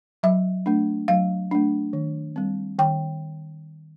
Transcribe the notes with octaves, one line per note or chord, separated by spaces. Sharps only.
F#3 E5
A3 D4
F#3 F5
A3 D4
D#3
G3 C4
D#3 G5